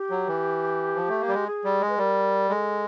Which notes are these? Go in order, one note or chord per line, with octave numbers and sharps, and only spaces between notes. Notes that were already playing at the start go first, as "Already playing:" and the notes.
Already playing: G4
F#3
E3
F3
A3
A#3
G3
G#3
G#4
G3
G#3
B4
G3 A#4
G#3 A4